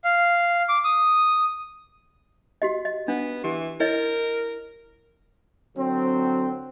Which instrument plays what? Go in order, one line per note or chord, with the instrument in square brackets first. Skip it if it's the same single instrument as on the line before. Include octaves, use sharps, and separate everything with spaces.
[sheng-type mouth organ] F5
D6
D#6
[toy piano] F#4 G4 D#5
D#5
[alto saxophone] B3 [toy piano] D4
[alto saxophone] E3 [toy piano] G4
[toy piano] E4 C#5 D#5 [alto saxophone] A#4
[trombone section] D3 F#3 C4